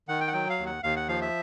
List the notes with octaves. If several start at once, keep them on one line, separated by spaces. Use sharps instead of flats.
D#3 F#5
G5
F#5
F#3 G5
F5
D#2
F#5
D#2 F5
F#5
F3 F5
E5